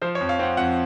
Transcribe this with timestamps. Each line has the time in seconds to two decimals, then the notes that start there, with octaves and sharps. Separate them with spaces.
0.02 F3 C5
0.15 C#5
0.21 F2
0.29 F5
0.39 C4 F#5
0.57 F2 F#5